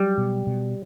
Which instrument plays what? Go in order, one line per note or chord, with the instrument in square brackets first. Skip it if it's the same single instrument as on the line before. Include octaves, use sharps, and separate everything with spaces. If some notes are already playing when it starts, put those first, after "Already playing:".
Already playing: [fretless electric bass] F#3 [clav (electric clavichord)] G3
[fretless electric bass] B2
B2